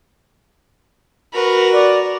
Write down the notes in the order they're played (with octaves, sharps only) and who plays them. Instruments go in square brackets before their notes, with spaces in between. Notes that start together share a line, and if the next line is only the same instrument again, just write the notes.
[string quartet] F#4 A#4 B4
[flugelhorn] D5